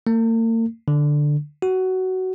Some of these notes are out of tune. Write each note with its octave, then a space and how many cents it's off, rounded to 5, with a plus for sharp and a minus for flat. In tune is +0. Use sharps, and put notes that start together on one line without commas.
A#3 -45
D3 +5
F#4 +15